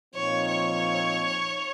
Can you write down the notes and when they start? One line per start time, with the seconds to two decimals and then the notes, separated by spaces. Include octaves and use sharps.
0.14 A#2 F3 C4 D#4 C#5
0.48 C#5